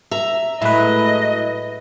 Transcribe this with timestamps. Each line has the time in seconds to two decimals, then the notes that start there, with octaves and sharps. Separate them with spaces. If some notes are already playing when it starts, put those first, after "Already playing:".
0.11 E5 A#5
0.62 A2 F#3 G#3 E4 B4 D#5